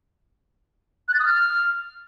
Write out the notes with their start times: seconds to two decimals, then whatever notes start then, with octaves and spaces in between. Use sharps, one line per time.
1.08 F#6
1.14 A6
1.20 D#6
1.25 F6